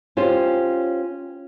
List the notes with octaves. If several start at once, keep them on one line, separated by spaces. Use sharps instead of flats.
C#4 F4 G4 C5